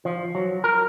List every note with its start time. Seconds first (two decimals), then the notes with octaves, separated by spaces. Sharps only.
0.05 F3
0.35 F#3
0.64 A#4